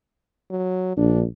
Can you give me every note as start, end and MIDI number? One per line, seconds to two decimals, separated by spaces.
0.50 0.94 54
0.97 1.24 34
0.97 1.22 62